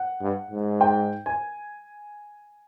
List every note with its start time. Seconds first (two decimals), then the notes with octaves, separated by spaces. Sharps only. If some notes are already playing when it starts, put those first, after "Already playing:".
Already playing: F#5
0.21 G2
0.51 G#2
0.81 G5
1.26 G#5